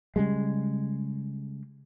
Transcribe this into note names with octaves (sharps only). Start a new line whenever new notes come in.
C#3 G3 G#3